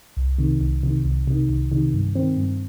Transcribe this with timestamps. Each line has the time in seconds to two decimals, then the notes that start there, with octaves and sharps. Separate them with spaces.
0.17 C2
0.38 C3 D#3
0.61 C2
0.83 C3 D#3
1.05 C2
1.27 C3 D#3
1.49 C2
1.72 C3 D#3
1.94 G2
2.15 D#3 C4
2.37 G2